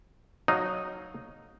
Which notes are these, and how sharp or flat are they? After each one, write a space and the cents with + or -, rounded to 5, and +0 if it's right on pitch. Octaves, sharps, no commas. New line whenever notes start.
F#3 +0 D#4 -5 F5 +0